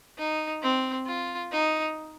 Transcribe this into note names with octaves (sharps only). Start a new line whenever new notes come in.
D#4
C4
F4
D#4